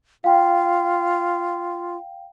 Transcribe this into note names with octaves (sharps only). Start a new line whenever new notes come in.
F4 F5 G5